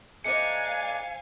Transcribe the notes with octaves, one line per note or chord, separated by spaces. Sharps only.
A3 D4 D#4 C5 F5 G#5 C#7